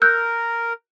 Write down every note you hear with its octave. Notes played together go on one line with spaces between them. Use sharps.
A#4 E6 F#6 G6